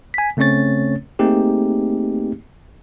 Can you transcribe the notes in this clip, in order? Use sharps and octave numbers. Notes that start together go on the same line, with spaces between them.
G#5 B6
C#3 A3 C4 C#4 C#5 A6
A3 A#3 C4 D#4 G4 G#4